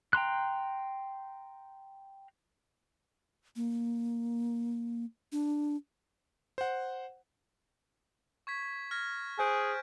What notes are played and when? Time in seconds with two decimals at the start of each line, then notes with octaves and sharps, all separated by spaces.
0.13 G5 A#5 C6 F#6
3.56 A#3
5.32 D4
6.58 C5 F#5
8.47 C#6 G#6 B6
8.91 F6 G#6 A#6
9.39 G#4 C5 G#5 F#6 G6 D7